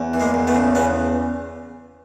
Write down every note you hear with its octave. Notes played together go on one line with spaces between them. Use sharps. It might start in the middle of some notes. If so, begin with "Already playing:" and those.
Already playing: E2
E3
G#3 A#3
E2
A3 B3
C#3
E2 B3 C#4